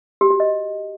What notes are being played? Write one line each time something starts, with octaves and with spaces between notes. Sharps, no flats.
G4
F#4
D#5